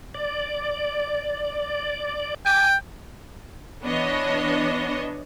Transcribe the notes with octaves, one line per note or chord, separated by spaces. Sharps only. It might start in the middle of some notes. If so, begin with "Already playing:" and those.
D5
G5 G#5 D6
E3 B3 D4 C#5 D#5